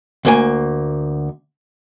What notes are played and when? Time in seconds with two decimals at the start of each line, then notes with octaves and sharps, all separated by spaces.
0.25 D2 A#3 G#5